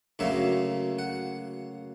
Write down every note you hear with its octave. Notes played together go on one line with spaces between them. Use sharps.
D2 C#3 F#3 A#3 E5
F#5